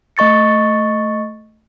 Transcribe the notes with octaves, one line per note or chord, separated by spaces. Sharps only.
A3 D#5 C#6 A6 C#7